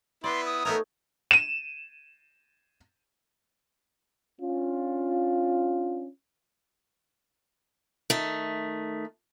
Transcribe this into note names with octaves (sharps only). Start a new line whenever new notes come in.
B3 E4 B4 D5 C6
D#6
A3 B3 D#4 A#4 C#5 E5
D#7 E7
C#4 D4 F4
D#3 A3